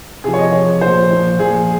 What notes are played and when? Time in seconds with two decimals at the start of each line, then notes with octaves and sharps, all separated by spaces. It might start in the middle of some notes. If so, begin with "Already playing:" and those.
0.24 C3 F3 G#4
0.33 C#5
0.38 D#5
0.52 C3 F3 C#5
0.81 A#2 F3 C5
1.10 A#2 F3
1.39 A#2 F3 G#4